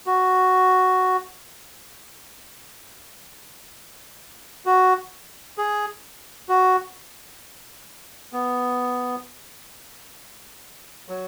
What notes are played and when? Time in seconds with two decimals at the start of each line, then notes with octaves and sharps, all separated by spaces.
0.06 F#4
4.66 F#4
5.58 G#4
6.49 F#4
8.33 B3
11.09 F#3